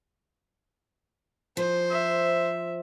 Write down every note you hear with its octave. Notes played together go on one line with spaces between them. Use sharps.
F3 C5
E5